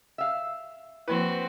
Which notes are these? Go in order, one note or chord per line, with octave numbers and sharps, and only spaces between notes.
E5 F5
F3 A#3 C4 E4 F#4 B4